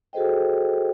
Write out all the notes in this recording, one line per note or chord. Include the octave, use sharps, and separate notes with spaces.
F#4 G#4 A4 C5 D#5 G5